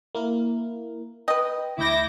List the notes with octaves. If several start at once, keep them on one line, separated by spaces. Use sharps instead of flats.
A#3 E4 A#4
B4 D#5 G5
D2 E4 D6 G6 A#6